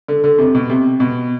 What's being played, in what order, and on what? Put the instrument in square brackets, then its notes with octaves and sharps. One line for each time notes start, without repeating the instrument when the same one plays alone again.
[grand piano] D3
D3
C3
B2
C3
B2